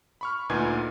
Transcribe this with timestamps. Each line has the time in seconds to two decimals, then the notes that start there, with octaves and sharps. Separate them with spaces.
0.21 B5 C#6 F6
0.49 D2 A#2 D#4 B4 G#5 G#6